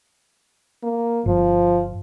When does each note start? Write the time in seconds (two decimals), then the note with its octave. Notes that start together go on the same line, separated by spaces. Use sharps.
0.83 A#3
1.26 G1 F3